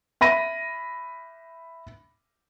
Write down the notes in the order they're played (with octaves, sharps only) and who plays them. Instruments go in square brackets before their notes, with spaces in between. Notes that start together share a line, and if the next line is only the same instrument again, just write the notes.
[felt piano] E5 B5 A#6 D#7